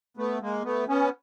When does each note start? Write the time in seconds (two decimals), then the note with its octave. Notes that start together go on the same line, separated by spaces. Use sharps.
0.17 A3 B3
0.41 G#3 A#3
0.64 A3 B3
0.88 B3 C#4